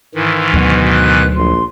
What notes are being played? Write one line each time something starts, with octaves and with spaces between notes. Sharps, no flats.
G#2 D#3 E3 E4
D2 B2 F#3 F#4
F#6
A#1 C6